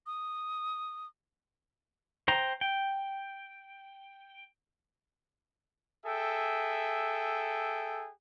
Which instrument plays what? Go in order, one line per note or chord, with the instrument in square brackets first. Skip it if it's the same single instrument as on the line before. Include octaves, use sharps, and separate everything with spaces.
[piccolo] D#6
[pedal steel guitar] C5 G5 A#5
G5
[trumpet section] G#4 A4 E5 G5